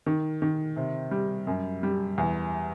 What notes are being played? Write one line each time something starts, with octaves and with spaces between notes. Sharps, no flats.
D#3
D#3
C3
G3
F#2
G3
E2